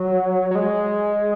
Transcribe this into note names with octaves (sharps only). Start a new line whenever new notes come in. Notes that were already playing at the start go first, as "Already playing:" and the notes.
Already playing: F#3
F#3
G#3